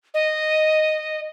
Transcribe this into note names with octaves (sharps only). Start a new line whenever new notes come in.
D#5